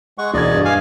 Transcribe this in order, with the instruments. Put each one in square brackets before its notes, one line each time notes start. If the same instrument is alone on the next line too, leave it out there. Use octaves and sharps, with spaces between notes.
[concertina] G#3 F#5 C#6
[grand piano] E1 G#6 [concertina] D5 D#5
[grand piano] G2
[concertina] F5 G#5